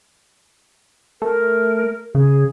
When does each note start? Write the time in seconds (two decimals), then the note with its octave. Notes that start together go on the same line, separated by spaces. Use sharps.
1.22 A3 A#4
2.15 C#3 G#4